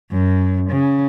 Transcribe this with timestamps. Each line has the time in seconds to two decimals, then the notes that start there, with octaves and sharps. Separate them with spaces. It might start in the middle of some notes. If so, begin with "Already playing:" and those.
0.12 F#2
0.71 C#3